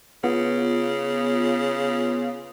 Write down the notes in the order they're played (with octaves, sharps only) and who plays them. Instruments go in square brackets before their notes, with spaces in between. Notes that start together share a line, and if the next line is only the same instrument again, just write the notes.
[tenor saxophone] C#3 [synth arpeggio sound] B3 F4